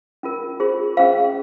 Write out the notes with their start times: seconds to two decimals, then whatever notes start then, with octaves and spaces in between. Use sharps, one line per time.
0.23 C#4 F4 A#4
0.60 F4 G#4 C5
0.97 C#4 G#4 C5 F5